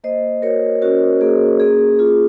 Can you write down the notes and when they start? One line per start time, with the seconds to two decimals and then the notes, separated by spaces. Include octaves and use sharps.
0.04 A#3 C5 D#5
0.42 F#4 A#4 C#5
0.82 C#4 F#4 A#4
1.21 A#3 G#4
1.60 A#3 G#4
1.99 F4 G#4